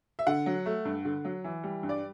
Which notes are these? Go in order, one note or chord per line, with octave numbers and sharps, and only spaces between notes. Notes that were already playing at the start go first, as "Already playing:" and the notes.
E5
D3 F#5
F#3
A3
G2
D3
F#3
E3
G3
G2
D5